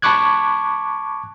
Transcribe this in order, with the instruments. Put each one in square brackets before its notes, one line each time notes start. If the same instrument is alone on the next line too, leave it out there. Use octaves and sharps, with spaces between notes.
[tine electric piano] A5 B5 C#6 D6 F#6 G#6